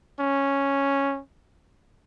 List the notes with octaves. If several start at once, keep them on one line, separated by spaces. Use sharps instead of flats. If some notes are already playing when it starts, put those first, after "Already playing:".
C#4